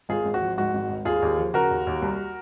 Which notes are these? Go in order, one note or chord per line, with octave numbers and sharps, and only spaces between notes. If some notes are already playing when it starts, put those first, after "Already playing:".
G#1 F4 G#4
G#1
F#4
F3
G#2 F#4
G#1
G#1
D#2 F4 G#4
D#2
F3
C#3 F#4 A#4
D#2
D#2
C2